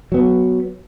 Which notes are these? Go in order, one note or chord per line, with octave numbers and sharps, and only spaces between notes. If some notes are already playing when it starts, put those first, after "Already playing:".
F#3 B3